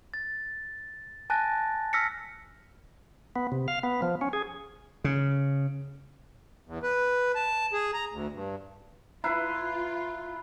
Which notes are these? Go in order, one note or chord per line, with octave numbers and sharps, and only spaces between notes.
A6
G#5 A5 F#6 A6 A#6
E6 F6 A#6 B6 C#7
B3
C3
F5
B3
F3
C#4
G#4
C#3
E2
B4
A5
G#4
A#5
D2
G2
E4 F4 B4 A#5 F#6 C7